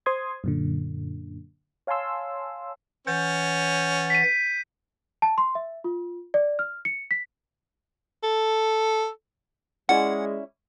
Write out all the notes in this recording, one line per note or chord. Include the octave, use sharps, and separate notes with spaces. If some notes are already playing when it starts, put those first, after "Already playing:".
C5 C6 D#6 G#6
F#2 A#2 D3
C#5 F5 G#5 A5 C6 E6
E3 C#4 F#5 G6 A6
B6 D#7
A5
C6
E5
F4
D5
F6
C#7
B6
A4
G#3 C#4 E4 D5 F#5